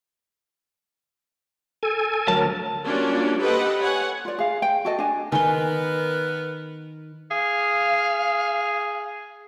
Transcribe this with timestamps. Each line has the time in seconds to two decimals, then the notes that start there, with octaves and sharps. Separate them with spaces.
1.83 A4 G#5
2.28 D2 F#3 A#4 A5
2.83 G3 A#3 C#4 D4 F4 F#4
3.39 G4 A4 B4 C5 D#5 F#5
3.79 C#5 F#5 G#5
4.25 F4 D5
4.38 G#4 F5
4.62 G5
4.85 F#4 A4 D#5
4.99 D4 G#5
5.32 D#3 B3 A#4 B4 G#5 C6
7.31 G#4 F5